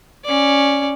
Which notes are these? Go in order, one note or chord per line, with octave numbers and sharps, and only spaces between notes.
C#4 D5